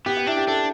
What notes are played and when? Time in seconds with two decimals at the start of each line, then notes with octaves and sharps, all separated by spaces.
0.06 B3 G4
0.17 G4
0.27 D4 E4
0.37 G4
0.47 D4 A4